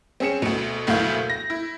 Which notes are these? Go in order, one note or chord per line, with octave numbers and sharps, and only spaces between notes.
C4 C#4 G#4 C#7 E7
D2 B2
F#1 D2 B2 E4 F5 G6
A#6
E4